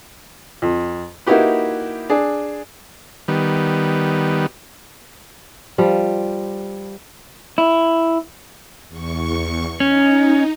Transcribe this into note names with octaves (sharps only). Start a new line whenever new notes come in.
F2
A#3 D#4 E4 F#4 G4 B4
D4 G#4
D#3 G3 B3
F3 G3
E4
E2 C#6
C#4 D#4